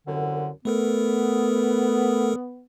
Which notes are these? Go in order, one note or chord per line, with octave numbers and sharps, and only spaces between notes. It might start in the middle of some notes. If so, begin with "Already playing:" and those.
C2 F#2 D3
A3 B3 A4 A#4